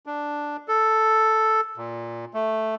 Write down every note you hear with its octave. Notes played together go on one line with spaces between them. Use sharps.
D4
A4
A#2
A3